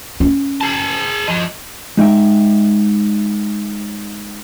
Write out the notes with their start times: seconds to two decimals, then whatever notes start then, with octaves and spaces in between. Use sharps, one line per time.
0.20 C#4
0.61 G#4 A5
1.28 F3 D#5
1.97 G#3 D#4 E5 G5